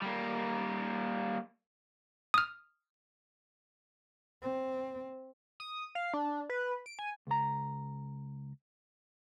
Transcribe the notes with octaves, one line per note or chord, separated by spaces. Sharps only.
G3 A#3
D#6 F6
C4
D#6
F5
D4
B4
D7
G#5
C#2 A#5